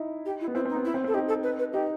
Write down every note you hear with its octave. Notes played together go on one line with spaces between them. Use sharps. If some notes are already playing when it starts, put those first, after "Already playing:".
Already playing: D#4 E4
G4
E4
B3
C4 E4
C4
D#4
B3
E4
C4
C4
A4
D#4 G4
A4
B4
B4
D#4 G4